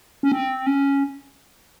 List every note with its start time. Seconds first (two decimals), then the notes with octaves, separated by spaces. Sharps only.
0.23 C#4
0.32 C4
0.66 C#4